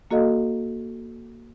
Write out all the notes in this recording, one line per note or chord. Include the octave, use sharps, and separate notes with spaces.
A#3 F#4 A4 D#5 F5